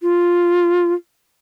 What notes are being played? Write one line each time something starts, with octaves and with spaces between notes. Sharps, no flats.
F4